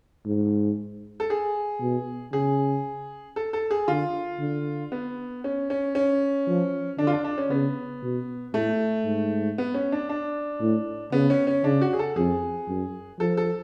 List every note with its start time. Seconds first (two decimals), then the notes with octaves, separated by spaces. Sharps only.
0.26 G#2
1.20 A4
1.30 G#4
1.81 B2
2.33 C#3 G#4
3.36 A4
3.53 A4
3.71 G#4
3.88 D3 F4
4.40 D3
4.92 B3
5.44 C#4
5.70 C#4
5.95 C#4
6.47 F3
6.99 D3 D4
7.07 F4
7.12 D4
7.24 D4
7.38 C#4
7.50 C#3 B3
8.03 B2
8.54 A2 A3
9.05 G#2
9.58 B3
9.74 C#4
9.92 D4
10.09 D4
10.61 A2
11.12 C#3 B3
11.30 C#4
11.47 C#4
11.64 C#3 D4
11.81 F#4
11.93 G#4
11.99 A4
12.16 F2 G#4
12.68 F#2
13.19 F3 A4
13.37 A4